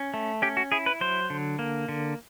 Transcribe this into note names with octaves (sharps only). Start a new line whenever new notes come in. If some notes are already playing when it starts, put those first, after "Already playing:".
Already playing: C#4
A3
C#4 G4
F#4
E4 G#4
B4
F#3 C5
D3
A#3
D3